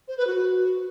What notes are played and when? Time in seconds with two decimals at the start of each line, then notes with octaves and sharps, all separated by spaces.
0.08 C5
0.17 B4
0.27 F#4